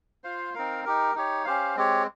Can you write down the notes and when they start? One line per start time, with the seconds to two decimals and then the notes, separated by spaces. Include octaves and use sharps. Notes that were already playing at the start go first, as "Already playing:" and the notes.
0.24 F4 C5 F5
0.54 C4 D#4 A#4 F5
0.85 D#4 G4 A#4
1.15 D#4 G4 C#5
1.45 C#4 G4 C5 F5
1.77 G#3 C4 G4 C#5